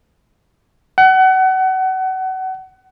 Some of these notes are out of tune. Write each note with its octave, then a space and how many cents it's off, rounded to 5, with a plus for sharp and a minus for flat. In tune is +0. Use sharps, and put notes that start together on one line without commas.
F#5 +30